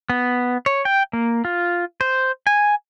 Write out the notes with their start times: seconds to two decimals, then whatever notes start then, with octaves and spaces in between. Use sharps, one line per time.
0.10 B3
0.66 C#5
0.85 G5
1.13 A#3
1.45 F4
2.01 C5
2.47 G#5